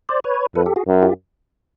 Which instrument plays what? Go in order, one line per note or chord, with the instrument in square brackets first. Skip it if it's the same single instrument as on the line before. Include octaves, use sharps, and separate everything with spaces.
[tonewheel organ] C5 D5
B4 C#5
[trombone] F2 [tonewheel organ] A4 B4
[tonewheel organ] G4 A4
F#4 G#4
[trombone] F#2
[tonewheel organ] F4 G4